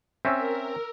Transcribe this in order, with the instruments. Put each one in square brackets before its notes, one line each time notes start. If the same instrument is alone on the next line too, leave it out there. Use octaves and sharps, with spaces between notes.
[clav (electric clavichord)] C4 C#4 [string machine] A#4 [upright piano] E5 E6